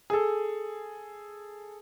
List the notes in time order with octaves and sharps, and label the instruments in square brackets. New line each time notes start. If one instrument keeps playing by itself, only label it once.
[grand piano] G#4 A4